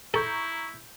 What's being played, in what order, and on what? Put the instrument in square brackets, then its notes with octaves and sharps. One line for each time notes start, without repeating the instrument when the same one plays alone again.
[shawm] E4 [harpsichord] A4 [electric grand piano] A#5 C#6 G6